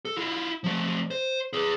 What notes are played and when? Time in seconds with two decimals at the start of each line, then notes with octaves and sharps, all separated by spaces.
0.05 A4
0.17 E4 F4
0.64 F3 A3
1.10 C5
1.53 G#4 B4